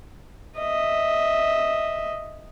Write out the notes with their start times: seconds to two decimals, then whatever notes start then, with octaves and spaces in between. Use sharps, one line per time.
0.59 D#5 E5